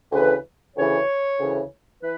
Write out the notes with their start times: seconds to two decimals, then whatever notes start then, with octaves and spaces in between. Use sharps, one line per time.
0.12 D2 C#3 E3 B4
0.76 D2 C#3 E3 C#5
1.39 D2 C#3 E3
2.02 E3 B4